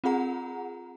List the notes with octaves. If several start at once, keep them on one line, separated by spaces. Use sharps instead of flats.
C4 F4 G#4 F#5 A#5